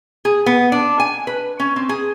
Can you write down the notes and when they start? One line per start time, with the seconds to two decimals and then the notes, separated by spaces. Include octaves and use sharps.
0.25 G#4
0.46 B3
0.72 D4
1.00 G#5
1.27 B4
1.60 C#4
1.76 C4
1.89 G#4